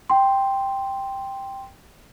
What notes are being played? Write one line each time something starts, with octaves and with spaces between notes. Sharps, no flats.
G5 C6